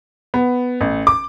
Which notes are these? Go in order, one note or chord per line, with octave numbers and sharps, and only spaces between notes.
B3
A1
D6